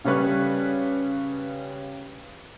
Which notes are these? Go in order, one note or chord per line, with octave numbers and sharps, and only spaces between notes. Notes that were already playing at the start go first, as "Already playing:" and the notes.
C#3 G3 C#4 A4 B4 C#5